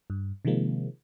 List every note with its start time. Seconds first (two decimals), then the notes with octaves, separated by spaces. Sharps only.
0.10 G2
0.45 C3 D#3 F3 G#3 A#3 C4